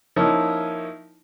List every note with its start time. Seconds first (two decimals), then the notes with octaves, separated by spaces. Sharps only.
0.16 F3 A#3 C#4 D#4 E4